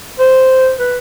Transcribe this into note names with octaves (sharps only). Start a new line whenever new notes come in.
C5
B4